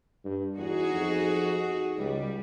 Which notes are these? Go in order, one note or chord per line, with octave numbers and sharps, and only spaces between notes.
G2
E2 D#4 F#4 G#4
F2
C#2 G3